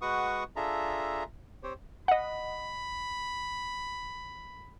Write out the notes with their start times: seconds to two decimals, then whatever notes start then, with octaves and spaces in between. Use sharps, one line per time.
0.01 G#3 F#4 B4 F#5 C#6 D#6
0.56 D4 F4 G#4 A4 E5 A#5
1.63 C4 G4 C5 C#5
2.08 D#5 F#5 B5